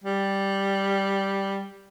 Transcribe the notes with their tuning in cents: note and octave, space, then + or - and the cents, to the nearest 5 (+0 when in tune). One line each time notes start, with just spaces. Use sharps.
G3 +0